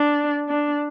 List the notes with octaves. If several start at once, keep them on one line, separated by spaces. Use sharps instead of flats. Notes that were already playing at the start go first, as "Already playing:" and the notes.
Already playing: D4
D4